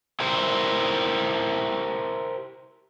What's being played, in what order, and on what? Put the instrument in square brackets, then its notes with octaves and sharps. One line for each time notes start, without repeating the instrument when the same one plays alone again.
[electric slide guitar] E4 G4 A#4 C5